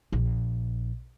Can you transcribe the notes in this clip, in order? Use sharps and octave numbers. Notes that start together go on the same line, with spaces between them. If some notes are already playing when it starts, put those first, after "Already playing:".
A#1